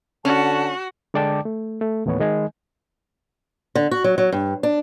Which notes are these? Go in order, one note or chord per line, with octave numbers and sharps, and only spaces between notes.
D3 C#4 F#4 A5
D3 G#3 D5 G5 A5 D6
A3
A3
D#2 A2 E3 B3 C#5
D#3 G#3 D#5 G#5
D3
F#4
F#3
F#3
G2
D4